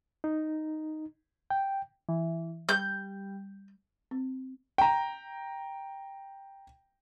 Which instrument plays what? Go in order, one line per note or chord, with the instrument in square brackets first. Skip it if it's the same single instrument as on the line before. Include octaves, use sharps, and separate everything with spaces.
[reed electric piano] D#4
G5
[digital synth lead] E3
[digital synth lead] G3 [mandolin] G6
[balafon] C4
[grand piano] G5 A#5